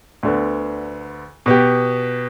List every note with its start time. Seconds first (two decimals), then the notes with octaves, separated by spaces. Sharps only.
0.23 D2 D3 B3
1.46 B2 B3 G4